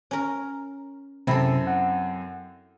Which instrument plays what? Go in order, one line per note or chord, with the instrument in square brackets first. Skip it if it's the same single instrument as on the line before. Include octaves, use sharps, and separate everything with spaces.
[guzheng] C#4 A#4
[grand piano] F#2 C4 [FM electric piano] C3 [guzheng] E4 A4
[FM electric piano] F#5